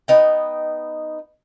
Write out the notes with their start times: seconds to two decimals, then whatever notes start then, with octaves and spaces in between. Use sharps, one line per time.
0.08 B3 D#4 G5